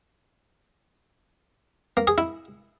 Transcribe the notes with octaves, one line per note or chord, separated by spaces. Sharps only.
A#3
G#4
E4